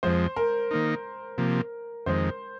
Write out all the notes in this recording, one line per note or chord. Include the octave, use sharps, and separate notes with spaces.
F2 F3 G#3 C5
A#4
D#3 A#3 D#4
C3 F3 A#3
F2 D#3 G#3 C5